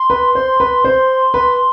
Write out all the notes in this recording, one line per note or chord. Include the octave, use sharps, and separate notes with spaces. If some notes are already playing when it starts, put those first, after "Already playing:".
Already playing: C6
B4
C5 C6
B4
C5
B4